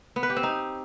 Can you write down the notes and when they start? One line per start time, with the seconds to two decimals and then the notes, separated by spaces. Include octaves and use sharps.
0.16 B3
0.23 B4
0.30 G4
0.36 C4
0.43 D#4